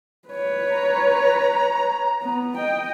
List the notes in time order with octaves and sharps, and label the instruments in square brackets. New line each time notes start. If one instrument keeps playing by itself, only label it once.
[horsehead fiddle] B4 C#5
[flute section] A#5
[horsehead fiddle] B3
D#5 G5